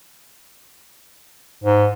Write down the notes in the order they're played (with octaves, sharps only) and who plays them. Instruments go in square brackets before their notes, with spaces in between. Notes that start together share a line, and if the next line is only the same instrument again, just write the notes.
[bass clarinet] G#2